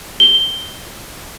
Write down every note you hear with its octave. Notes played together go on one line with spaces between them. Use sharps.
G7